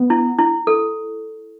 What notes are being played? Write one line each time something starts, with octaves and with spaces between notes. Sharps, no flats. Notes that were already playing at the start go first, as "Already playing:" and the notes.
Already playing: B3
E4
E4
A4